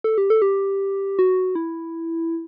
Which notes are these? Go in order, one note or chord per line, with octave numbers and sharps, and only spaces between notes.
A4
G4
A4
G4
F#4
E4